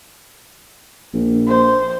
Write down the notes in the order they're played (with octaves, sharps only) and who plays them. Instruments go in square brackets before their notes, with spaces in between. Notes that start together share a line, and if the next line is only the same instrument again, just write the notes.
[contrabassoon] A#1
[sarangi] C5